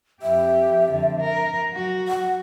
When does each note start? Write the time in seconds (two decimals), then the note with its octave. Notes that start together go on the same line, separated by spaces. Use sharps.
0.22 F2 G4 E5
0.91 F2 D3
1.21 A#4
1.72 F#3 F#4
2.08 F#5